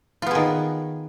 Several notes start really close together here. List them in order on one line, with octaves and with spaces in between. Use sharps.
F4 B3 G#4 D#3